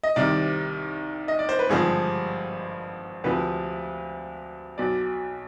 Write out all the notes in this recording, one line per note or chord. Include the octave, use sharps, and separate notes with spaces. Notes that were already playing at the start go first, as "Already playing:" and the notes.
D#5
C2 C3 D#3 D5
D#5
D5
C5
B4
G#1 G2 D3 F3 G#4
D2 C3 F3 B4
B1 B2 D5